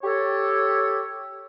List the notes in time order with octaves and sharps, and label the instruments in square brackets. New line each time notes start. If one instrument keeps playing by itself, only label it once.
[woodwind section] G4 A4 C#5